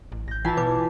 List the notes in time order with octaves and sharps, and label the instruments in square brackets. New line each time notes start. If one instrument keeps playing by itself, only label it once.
[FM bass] A1
[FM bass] A1 [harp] G6 A#6
[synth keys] E3 [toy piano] F4 F#5 [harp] G#5 A5
[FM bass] B2 [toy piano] B4 D6